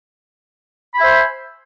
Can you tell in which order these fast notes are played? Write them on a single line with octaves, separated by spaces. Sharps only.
B5 G#5 E5 C5